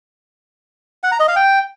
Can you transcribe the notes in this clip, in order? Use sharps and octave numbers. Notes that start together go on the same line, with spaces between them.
F#5
A#5
D#5
F5
G5